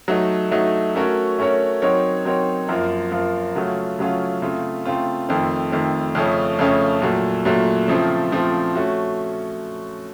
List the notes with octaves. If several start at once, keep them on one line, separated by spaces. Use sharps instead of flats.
F#3 A3 D#4
F#3 A3 D#4
A3 C#4 F#4 A#4 C#5
A3 C#4 F#4 A#4 C#5
F#3 C4 D#4 A#4 C#5
F#3 C4 D#4 A#4 C#5
F#2 F3 A#3 F4 A#4
F#2 F3 A#3 F4 A#4
C#3 F#3 A3 C#4 F4
C#3 F#3 A3 C#4 F4
C#3 A3 C4 F4
C#3 A3 C4 F4
F2 D#3 A3 C4
F2 D#3 A3 C4
F2 C#3 A3 C#4
F2 C#3 A3 C#4
A#2 F#3 A3
A#2 F#3 A3
C#3 F3 A3 C4
C#3 F3 A3 C4
A3 C#4 F#4